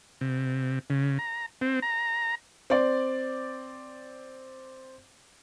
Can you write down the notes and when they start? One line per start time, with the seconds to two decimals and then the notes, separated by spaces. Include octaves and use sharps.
0.21 C3
0.90 C#3
1.19 A#5
1.61 C4
1.82 A#5
2.70 C4 D5